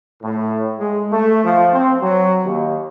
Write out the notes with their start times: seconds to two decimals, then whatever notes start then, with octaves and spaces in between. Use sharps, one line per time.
0.23 A2
0.79 G#3
1.12 A3
1.44 F3
1.73 C4
2.01 F#3
2.45 D#2